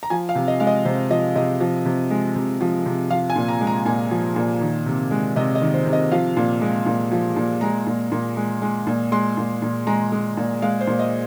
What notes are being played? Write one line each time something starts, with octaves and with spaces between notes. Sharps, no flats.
A#5
F3 G#5
F5
C3
D#5
G#3 F5
D#5
C3 C5
F3 D#5
C3 D#5
F3
C3
G#3
C3
F3
C3
F3 F5
G#5
A#2
A#5
G#3
A#5
A#2 G#5
F3
A#2
D#3
C3
G#3
C3 D#5
D#5
D#3
C5
C3
D#5
F3 F5
A#2
G#3
A#2
F3
A#2
G#3 A#5
A#2
A#2
G#3
G#3
A#2
G#3 C6
A#2
A#2
G#3 A#5
G#3
A#2
G#3 F5
C5
A#2
D#5